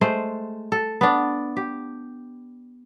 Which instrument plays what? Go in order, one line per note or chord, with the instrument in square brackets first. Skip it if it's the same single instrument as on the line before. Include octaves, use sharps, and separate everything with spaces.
[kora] G#3 A3 C5
A4
B3 D4
G4